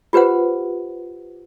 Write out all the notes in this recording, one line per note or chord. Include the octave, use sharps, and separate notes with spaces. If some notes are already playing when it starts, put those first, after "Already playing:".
F4 G4 B4 C5 F#5